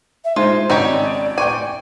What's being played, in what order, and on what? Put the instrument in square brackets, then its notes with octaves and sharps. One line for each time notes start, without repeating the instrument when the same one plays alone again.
[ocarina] E5
[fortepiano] G#3 D#4 [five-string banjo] F4 [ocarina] C5
[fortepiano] G#1 C#3 C#4 [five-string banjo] D#4 G4 C#5 [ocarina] D5
[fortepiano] G5 C#6 D6 [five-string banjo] G#5